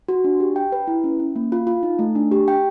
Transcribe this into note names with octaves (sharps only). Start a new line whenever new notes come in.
F#4
D4
G4
G5
B4
E4
C#4
C#4
A#3
F4
F4
D#4
A3
D4
G4
G5